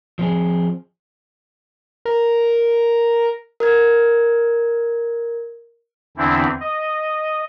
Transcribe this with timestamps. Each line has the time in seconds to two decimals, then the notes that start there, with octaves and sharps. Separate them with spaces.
0.19 F3 C4 G#4
2.05 A#4
3.60 A#4 F6 G#6
6.17 E2 D3 E3 C4 D4 E4
6.60 D#5